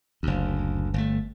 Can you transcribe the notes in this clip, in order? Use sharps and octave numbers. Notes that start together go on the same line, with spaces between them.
F#1 D2
G1 A3